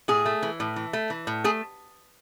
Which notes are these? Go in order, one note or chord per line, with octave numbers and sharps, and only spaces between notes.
A2 G#4
A3
E3
A2
E3
A3
E3
A2
A3 G#4